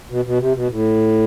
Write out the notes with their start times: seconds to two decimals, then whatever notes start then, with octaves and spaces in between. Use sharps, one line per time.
0.10 B2
0.25 B2
0.40 C3
0.54 B2
0.69 A2